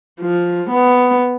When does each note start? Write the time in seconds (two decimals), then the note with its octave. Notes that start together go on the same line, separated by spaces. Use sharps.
0.21 F3
0.71 B3